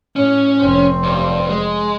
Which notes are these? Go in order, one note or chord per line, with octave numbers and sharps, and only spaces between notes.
A2 C#4
F1 C4
G2
G#3